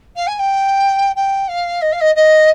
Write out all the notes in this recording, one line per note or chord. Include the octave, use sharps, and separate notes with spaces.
F5
G#5
G5
G5
F5
D#5
F5
D#5
D#5